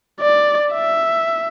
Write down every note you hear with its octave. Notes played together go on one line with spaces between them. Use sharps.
D5
E5